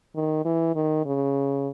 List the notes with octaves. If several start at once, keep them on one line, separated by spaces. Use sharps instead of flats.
D#3
E3
D#3
C#3